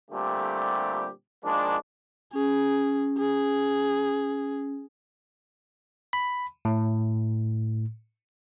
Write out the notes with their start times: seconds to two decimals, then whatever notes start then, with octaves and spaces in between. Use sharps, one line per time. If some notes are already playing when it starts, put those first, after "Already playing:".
0.11 A#2 D3 G3 A3 C4 G4
1.44 D#3 F3 G#3 A#3 D4
2.33 C#4 G#4
3.18 G#4
6.13 B5
6.65 A2